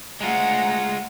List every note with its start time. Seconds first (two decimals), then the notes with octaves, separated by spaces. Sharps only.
0.21 D2 G#3 F4 F#5 A#5